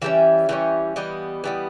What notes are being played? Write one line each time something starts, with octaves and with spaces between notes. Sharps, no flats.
E3 G3 C#4 E5
E3 G3 C#4
E3 G3 B3 D#5
E3 G3 B3